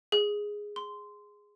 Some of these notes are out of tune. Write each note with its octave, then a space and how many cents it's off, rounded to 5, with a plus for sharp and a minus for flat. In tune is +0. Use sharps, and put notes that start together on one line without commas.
G#4 -5
C6 -15